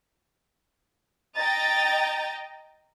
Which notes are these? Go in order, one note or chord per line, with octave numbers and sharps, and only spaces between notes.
D#5 G5 A#5 A6